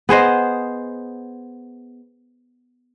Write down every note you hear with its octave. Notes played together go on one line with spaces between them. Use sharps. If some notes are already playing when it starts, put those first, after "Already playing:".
B3 G#4 C5 D#5